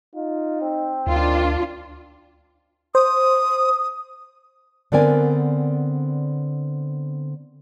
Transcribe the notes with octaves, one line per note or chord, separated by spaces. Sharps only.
D#4 F4
C4
D2 D#3 D4 F4
C5 D#6
D3 B3 C4 A#4 D5 G#5